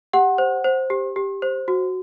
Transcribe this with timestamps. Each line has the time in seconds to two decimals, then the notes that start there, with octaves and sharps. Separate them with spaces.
0.13 G4 F#5
0.38 C5
0.64 C5
0.90 G4
1.16 G4
1.42 C5
1.68 F#4